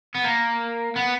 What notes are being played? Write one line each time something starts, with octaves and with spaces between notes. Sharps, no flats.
B3
A#3
B3